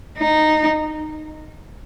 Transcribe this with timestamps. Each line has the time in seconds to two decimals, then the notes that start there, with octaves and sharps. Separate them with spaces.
0.18 D#4